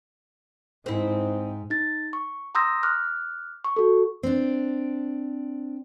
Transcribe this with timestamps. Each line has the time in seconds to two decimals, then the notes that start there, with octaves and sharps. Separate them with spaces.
0.86 G#2 C4 D#4 E4
1.70 D#4 A6
2.13 C#6
2.55 A#5 C6 D#6 E6 G6 A#6
2.83 D6 F6 F#6
3.65 C#6
3.76 F#4 A4
4.23 C4 D4